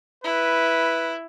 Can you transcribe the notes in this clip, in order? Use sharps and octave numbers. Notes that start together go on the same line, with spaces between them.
E4 B4